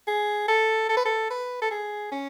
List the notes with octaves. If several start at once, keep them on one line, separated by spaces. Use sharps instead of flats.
G#4
A4
A4
B4
A4
B4
A4
G#4
C#4